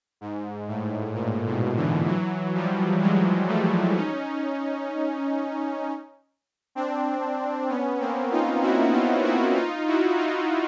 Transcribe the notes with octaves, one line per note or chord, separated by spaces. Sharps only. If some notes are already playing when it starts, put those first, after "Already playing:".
G#2
A2
A#2
B2
D3 E3
E3 F#3
F3 G3
F#3 G#3
G3 A3
C#4 D#4
C4 D4
B3 C#4
A#3 C4
D#4 F4
E4 F#4
D#4 F4
E4 F#4
D#4 F4
E4 F#4
D#4 F4